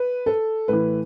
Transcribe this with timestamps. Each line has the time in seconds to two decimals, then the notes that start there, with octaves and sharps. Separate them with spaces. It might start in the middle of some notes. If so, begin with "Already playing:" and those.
Already playing: B4
0.26 A4
0.68 A2 E3 B4